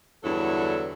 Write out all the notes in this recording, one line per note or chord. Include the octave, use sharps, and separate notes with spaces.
E2 G2 D3 F#3 E4 A4